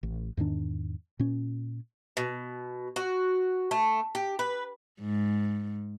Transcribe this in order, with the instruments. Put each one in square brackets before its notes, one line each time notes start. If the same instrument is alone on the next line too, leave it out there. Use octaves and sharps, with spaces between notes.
[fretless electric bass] A1
E2 G#2 D#3 D4
A#2 C#4
[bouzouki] B2
F#4
A3
G4
B4
[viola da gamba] G#2